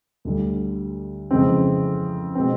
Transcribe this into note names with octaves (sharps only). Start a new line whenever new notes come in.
D2 D3 G3
F2 C#3 E3 G#3 C4
B2 G#3 C4